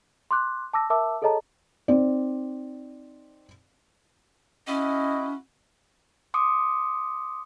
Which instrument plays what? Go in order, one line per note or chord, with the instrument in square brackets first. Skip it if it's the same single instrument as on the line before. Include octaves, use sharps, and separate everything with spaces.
[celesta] C6 D6 F#6
A5 D6 E6 A#6
A#4 E5 A5 D6 E6
G#4 A4 C#5 D#5 A5 A#5
[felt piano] C4 D#4 D5
[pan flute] C#4 [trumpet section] E4 F#4 D#5
[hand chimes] C6 D6 D#6 C#7